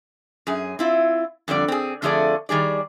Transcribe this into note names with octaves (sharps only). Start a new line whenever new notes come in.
F#2 G#4
C4 E4 F4
F2 D3 G3 D5
C4 G#4
F2 D3 F3 A3 G#4 D5
D#3 G3 G#4 D5